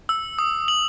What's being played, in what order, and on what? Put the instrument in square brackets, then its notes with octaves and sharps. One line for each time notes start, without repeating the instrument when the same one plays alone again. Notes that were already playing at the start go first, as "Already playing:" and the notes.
[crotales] E6
D#6
F#7